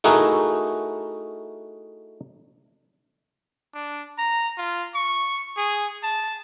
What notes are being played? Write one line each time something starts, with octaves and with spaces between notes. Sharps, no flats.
A3 D#4 E4 F#4 G#4 A#4
D4
A#5
F4
C#6
G#4
A5